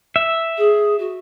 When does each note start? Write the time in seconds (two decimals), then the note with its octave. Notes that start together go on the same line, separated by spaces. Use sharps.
0.16 E5
0.58 G#4
0.99 F#4